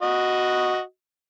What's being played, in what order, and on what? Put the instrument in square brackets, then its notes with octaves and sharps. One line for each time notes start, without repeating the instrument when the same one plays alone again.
[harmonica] F#4 D#5